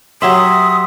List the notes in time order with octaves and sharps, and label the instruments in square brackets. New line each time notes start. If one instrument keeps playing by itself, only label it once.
[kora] F#3 G4 E5 [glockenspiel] C6 E6 B6 [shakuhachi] D#6